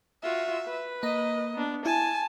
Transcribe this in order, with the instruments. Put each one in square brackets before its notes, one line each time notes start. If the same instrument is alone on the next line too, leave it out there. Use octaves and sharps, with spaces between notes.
[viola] F4 F#4 [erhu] E5
[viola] B4
[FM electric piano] A#3 A#5 [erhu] D#5
[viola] B3 D4
[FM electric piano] E4 [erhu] G#5 [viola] A5